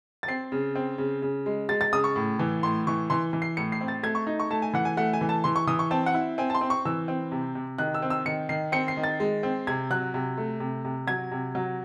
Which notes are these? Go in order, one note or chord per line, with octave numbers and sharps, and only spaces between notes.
A6
C4 C7
C#3
C4
C#3
C#3
G#3
G#3 A6
A6
C#3 D#6
C#6
A2
E3
A2 C6
E3 C#6
E3 C6
E3
C7
A2 C#7
C7
C4
A6
A3 G#6
C#6
D#4
C#6
A3 A5
G#5
E3 F#5
G#5
A3 F#5
G#5
E3
A5
E3 C6
C#6
E3 D#6
C#6
C4 A5
F#5
E4
C4 G#5
A5
C6
C4
C#6
E3 E6
C4
C3
C3
D#3 F#6
E6
C4
E6
D#3 C#7
D#3 C7
C4 C#7
C7
D#3
A6
G#3
C4
C3 G#6
F#3 F#6
C3
A3
C3
C3
F#3 G#6
C3
F#3